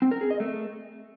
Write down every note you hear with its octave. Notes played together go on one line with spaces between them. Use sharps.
C4
A#4
G#4
D#5
A3